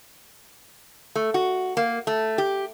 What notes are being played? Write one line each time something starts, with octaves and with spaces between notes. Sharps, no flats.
A3
F#4
A#3
A3
G4